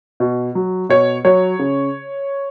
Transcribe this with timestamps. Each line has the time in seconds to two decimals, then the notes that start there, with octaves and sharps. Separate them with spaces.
0.20 B2
0.55 F#3
0.89 B2 C#5
1.25 F#3 C#5
1.59 C#3